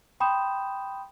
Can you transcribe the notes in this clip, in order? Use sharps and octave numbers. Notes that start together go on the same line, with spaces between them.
G5 B5 C6 D#6 G6 E7